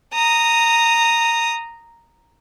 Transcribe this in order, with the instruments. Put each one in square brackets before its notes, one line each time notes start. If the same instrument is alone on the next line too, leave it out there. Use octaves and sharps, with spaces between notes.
[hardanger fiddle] A#5 D#6